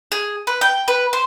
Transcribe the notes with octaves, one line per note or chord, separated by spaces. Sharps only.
G#4
B4
G5
B4
C5